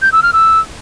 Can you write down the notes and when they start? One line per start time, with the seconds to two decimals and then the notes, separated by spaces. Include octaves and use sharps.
0.02 G6
0.12 E6
0.23 F6
0.33 E6